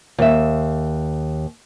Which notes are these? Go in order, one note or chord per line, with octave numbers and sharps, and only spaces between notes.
D#2 E5